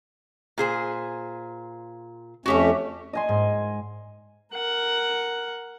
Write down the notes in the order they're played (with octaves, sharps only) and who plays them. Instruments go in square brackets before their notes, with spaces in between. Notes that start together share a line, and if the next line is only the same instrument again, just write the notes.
[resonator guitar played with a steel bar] A#2 G#4 C5
[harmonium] F2 A3 C#4 [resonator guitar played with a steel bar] F#4 G4 E5
[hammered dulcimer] D#5 G#5 C6
[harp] G#2
[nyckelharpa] A#4 F#5